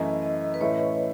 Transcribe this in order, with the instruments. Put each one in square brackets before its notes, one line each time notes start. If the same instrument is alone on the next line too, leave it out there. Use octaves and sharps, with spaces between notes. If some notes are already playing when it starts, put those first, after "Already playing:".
Already playing: [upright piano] F#2 E3 A3 E4 [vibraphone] D#5
[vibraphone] D#5
B4
[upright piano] A2 E3 A3 C#4 E4 [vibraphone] C#5